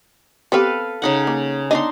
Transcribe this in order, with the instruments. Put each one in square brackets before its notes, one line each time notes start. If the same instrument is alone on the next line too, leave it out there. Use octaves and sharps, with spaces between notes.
[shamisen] B3 C4 G4 [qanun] A4 B4 F5
[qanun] C#3 D#4 F#5
[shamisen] A#3
[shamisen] B3 D#5 [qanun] D4 D#4 C6